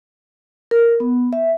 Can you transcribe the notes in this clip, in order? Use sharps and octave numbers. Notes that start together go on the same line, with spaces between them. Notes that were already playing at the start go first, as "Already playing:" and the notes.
A#4
B3
E5